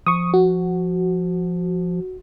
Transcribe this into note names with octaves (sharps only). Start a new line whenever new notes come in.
F3 C#6 D#6
F#4